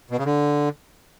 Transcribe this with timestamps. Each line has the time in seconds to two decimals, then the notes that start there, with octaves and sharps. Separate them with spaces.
0.11 B2
0.18 C#3
0.26 D3